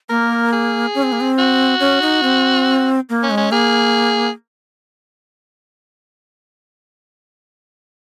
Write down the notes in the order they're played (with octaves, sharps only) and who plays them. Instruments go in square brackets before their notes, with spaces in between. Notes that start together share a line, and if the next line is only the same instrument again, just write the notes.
[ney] A#3 [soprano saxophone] A#4
[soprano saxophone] G#4
[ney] C#4
C4
A#3
C4
[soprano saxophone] F#4
[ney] C#4
D#4
C4
A#3
[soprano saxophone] C#4
[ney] G#3
[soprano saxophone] C#4
[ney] A#3 [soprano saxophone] G#4